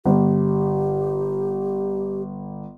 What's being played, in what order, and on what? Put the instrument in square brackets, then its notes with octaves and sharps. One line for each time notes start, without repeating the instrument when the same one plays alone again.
[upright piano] G1 [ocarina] G4